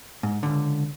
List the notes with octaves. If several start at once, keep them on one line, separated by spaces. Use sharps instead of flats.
G#2
C#2 D3